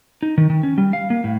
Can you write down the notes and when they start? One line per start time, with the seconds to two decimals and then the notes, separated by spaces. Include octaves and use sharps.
0.23 D#4
0.38 D#3
0.50 D#3
0.63 C#4
0.78 G3
0.93 F5
1.10 A#3
1.24 A2